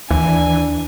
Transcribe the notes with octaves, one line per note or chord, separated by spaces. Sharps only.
D#2 E3 D4 G#5